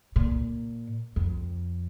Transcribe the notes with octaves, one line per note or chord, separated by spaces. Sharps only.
A#2
F2